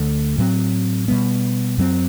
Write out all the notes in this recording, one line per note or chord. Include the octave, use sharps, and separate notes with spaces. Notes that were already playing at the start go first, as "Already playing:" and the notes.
Already playing: D2 D3 A3
A2 F#3 C4
B2 G3 B3
F#2 F#3 C4